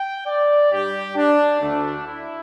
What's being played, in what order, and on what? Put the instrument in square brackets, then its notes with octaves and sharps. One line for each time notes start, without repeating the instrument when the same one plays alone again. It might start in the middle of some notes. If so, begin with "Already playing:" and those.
Already playing: [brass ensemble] G5
D5
G2 G3 G4
D4
D2 D3 A3 D4
E4